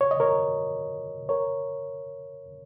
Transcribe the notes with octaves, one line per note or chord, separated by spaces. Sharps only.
C#5
D#5
A#4 C#5
A#4 C#5